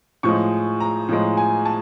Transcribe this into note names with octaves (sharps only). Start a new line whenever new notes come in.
A2 F3 G#3 C#6
A#5
A2 F3 G#3
G#5
A5